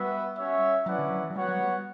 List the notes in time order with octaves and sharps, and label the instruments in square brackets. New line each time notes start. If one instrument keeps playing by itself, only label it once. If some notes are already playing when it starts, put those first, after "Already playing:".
Already playing: [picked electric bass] G3 [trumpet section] B3 F#4 B4 E5
[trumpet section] C#4 F#4 C#5 E5
[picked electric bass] F#3 [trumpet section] C#4 E4 B4 D5 F#5
[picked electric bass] D3
F#3
E3
F#3
[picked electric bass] G3 [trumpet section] B3 F#4 C#5 F#5
[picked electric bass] F#3
G3